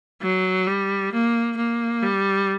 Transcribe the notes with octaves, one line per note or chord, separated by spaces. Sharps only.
F#3
G3
A#3
A#3
G3